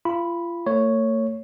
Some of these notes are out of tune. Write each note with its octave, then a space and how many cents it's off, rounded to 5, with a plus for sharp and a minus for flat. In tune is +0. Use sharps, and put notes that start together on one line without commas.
F4 -30 B5 -5
A3 +45 C#5 +0